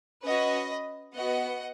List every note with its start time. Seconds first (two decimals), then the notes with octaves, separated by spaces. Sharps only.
0.23 C#4 F#4 B4 D#5
1.14 B3 F#4 D#5 F#5